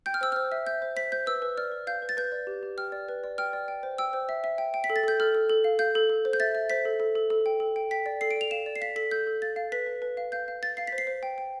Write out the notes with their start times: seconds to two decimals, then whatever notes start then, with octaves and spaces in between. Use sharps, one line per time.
0.06 G5 G6
0.14 F6
0.21 C5 E6
0.32 C5 F6
0.52 E5
0.67 E5 G6
0.82 C5
0.96 C5 B6
1.12 C5 G6
1.26 B4 E6
1.42 B4
1.57 D5 F6
1.72 B4
1.87 F5 G6
2.02 B4
2.09 A6
2.17 B4 G6
2.32 D5
2.47 G4
2.63 G4
2.77 G5 F6
2.92 D5
3.09 B4
3.24 D5
3.38 G5 F6
3.53 D5
3.68 G5
3.83 C5
3.98 G5 E6
4.13 C5
4.29 E5
4.44 E5
4.58 G5
4.74 G5
4.84 B6
4.90 A4
4.96 A6
5.04 A4 G6
5.20 A4 F6
5.35 A4
5.50 A4
5.64 F5
5.79 F5 G6
5.95 A4
6.09 A4
6.25 C5
6.33 G6
6.40 E5 A6
6.55 E5
6.70 C5 B6
6.85 A4
7.00 A4
7.15 A4
7.30 A4
7.46 G5
7.60 A4
7.76 G5
7.91 G5 B6
8.06 D5
8.21 A4 C7
8.31 D7
8.36 D5 F7
8.51 F5 E7
8.66 D5
8.76 C7
8.81 F5 B6
8.96 A4 B6
9.11 A4 G6
9.27 A4
9.42 F5 A6
9.56 F5
9.72 B4 B6
9.86 B4
10.02 B4
10.17 F5
10.32 F5 G6
10.48 F5
10.62 F5 A6
10.77 F5 C7
10.87 B6
10.92 C5
10.98 C7
11.07 C5
11.23 G5
11.38 G5